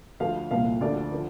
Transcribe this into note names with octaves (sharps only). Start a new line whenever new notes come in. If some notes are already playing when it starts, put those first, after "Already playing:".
D2 D3 F3 F5
C2 A#2 F3 F5
D2 D3 F3 D5
D3 F3